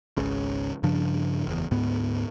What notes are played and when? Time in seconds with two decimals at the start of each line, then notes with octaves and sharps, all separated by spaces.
0.17 G#1 C#2 C#3
0.83 G2 C#3 F3 D4
1.46 F#1 E2
1.71 D2 G#2 B3